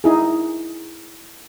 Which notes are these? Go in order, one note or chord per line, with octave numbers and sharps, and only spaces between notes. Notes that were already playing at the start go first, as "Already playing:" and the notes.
D#4 E4 G#4